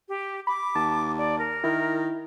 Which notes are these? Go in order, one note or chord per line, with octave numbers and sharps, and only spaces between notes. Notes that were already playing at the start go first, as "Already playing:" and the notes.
G4
B5 D6
D#2 A5
D5
A#4
D#3 E4